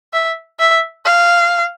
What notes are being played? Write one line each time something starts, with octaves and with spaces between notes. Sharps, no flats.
E5
E5
F5